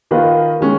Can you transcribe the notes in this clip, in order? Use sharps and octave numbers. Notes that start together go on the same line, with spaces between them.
D#3 A#3 F4 B4 D#5
D#3 G#3 C#4